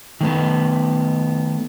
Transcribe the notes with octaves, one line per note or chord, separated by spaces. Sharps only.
D#3 A3 B3